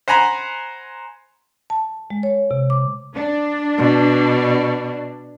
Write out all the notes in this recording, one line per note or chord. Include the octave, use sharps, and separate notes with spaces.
C5 F#5 G#5 A#5 B5
A5
G#3
C#5
C3
D6
D4
B2